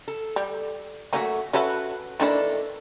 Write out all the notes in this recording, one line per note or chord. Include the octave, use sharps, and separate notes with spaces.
A4
G3
F#3 A3 A#3 C#4 F#4
C#4 F#4 A4 B4 E5
D#3 E3 A#3 D4 E4 A4